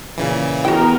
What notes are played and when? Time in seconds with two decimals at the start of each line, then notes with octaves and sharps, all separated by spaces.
0.18 A#2 C#3 E3
0.65 E2 B3 F#4 A#4 G5